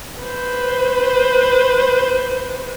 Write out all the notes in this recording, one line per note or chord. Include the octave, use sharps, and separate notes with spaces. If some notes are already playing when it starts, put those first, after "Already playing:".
B4 C5